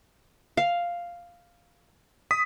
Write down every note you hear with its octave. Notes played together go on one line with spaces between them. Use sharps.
F5
D#6 B6